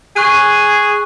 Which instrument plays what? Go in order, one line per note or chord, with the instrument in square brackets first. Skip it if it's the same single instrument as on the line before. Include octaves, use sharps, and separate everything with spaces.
[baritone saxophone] G#4 [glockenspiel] C#6 F#6 D#7